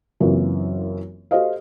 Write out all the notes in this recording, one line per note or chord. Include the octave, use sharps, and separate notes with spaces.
F#1 F#2 E3 A#3 C4 F4
F#4 G4 A4 C5 D#5 F5